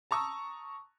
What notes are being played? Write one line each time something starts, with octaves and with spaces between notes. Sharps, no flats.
A5 A#5 C#6 D#6 E6